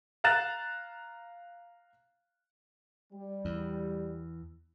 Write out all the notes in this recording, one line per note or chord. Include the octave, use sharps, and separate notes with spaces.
F5 A#5 F#6 A6 E7
G3
E2